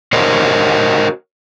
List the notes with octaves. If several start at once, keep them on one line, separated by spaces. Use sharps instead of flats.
F#4 A#4 C5 C#5 D#5